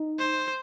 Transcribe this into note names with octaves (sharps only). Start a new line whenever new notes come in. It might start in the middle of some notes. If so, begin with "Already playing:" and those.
Already playing: D#4
C5